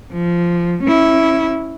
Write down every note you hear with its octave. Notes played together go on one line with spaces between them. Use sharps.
F3
C#4 E4